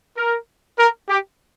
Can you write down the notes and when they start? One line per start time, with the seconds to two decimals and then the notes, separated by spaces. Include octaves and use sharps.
0.18 A#4
0.79 A#4
1.09 G4